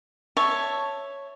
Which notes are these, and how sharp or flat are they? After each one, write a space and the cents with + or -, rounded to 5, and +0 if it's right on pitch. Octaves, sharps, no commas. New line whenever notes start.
C#5 +0 E5 +0 A5 +0